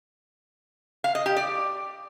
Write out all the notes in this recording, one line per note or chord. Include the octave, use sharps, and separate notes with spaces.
F5
D#5
G4
D5